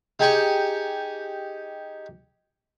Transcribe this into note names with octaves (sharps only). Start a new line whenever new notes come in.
D#4 G4 G#4 G#5 C#6